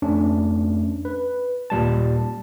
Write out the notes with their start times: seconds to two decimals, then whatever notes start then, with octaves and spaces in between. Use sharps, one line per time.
0.02 F2 A3 C#4 D4
1.05 B4
1.70 D#2 A#2 G3 A5